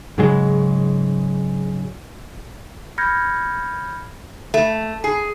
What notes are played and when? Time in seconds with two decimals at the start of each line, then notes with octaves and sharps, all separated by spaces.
0.18 G#2 C#3 F#3 G#3
2.98 B5 F6 G6 G#6 A#6 C#7
4.54 A3
5.04 G#4